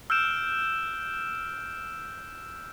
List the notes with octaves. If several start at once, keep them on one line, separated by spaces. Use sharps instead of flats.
E6 F6 G6 D7 E7